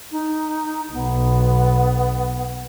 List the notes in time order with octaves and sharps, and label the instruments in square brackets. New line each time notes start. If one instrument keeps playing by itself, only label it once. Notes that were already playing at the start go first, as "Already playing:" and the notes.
[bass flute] D#4
[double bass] B1 [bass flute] B3